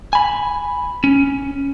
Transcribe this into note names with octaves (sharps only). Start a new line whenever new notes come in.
G#5 B5
C#4